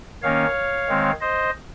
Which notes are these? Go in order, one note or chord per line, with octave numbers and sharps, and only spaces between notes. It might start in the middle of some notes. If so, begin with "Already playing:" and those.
D#3 A#3 C#4 C#5 F5
D#3 G#3 C4
C5 D#5